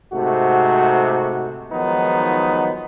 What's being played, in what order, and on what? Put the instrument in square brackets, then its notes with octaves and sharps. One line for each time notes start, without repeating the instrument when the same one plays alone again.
[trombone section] G#2 C3 A3 F#4
D#3 F3 F#3 G#3 B3 D#4